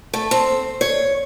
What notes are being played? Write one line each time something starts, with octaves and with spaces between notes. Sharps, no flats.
A3
C4
C#5